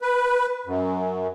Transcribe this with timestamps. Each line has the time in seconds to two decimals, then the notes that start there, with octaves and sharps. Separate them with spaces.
0.02 B4
0.66 F#2